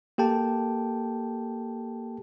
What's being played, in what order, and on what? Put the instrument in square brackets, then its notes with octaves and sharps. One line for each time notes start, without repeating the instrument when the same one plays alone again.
[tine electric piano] A#3 G4 A4 G5 A5